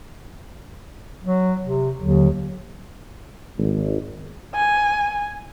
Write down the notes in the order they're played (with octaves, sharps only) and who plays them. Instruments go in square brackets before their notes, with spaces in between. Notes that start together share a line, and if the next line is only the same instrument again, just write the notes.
[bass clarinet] F#3
C3
[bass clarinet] D#2 [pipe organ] D3 F#3
[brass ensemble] G#1
[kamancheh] G#5